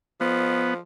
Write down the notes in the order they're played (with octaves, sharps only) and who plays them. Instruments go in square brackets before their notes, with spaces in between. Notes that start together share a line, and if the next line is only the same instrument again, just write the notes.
[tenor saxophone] F3 [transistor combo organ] B3